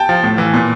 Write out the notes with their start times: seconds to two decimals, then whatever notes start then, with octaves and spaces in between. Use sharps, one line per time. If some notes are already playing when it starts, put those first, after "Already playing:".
Already playing: G5 A5
0.09 F3
0.24 A2
0.38 E3
0.54 A#2